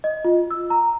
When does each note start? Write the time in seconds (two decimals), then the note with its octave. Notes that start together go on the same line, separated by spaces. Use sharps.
0.04 D#5
0.25 F4
0.51 E6
0.70 A#5